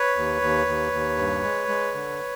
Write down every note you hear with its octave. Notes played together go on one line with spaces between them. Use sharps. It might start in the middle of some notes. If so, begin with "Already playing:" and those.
Already playing: B4 C#5
D#2
D#2
D#2
D#2
G2
G#3
G#3
D3